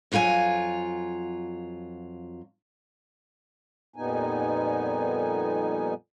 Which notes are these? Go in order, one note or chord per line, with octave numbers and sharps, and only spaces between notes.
F2 F#3 F4 A4 G#5
F2 A#2 G3 B3 D#4 G#5